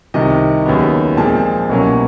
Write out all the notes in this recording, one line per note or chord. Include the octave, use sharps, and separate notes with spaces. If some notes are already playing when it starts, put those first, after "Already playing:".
C2 C3 D#3 D#5
D#2 C#3 F#3 B3
A#2 F3 G#3 C4 A5
C2 B2 F#3 A#3 C#4